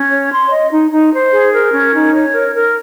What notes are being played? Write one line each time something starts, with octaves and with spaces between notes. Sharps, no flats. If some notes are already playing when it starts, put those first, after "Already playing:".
Already playing: C#4
C#5
C6
D#5
D#4
D#4
C5
G#4
A#4
C#4
D#4
C#5
A#4
A#4